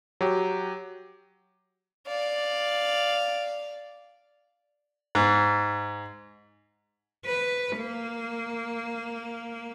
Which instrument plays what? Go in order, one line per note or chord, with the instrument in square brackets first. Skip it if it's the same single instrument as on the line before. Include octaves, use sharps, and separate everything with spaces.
[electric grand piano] F#3 G4
[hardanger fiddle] D5 F5
[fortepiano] G#2
[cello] B4
A#3